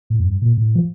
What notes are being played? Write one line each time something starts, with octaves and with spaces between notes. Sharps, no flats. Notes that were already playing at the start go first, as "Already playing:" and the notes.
A2
F2
G2
A#2
A2
F3